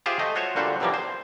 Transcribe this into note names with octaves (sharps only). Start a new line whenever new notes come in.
F4 G4 G#4 C5 E5 F5
A3 D#5
F4 F#4 C5 C#5 E5
A#2 D3 G3 F#4 C5
F#2 C3 E3 F3 G3 A#3
C5